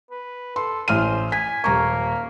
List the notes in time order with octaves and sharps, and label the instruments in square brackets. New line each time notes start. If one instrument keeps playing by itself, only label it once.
[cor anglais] B4
[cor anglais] A4 [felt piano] C6
[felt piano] A1 F6 D#7 [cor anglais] C5
[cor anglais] G#5 [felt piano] B6
[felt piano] D#1 A#5 C#6 [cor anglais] A#3